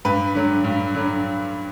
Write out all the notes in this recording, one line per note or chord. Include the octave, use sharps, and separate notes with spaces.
G2 B4
D3 F#3
G2
D3 F#3